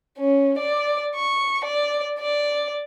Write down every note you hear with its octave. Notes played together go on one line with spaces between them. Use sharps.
C#4
D5
C#6
D5
D5